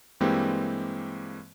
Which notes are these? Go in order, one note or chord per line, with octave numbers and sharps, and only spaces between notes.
G2 E3 G#3 A#3 C4 G4